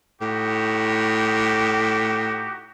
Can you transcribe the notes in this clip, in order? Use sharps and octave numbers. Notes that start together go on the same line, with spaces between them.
A2 D#4 F#4 G4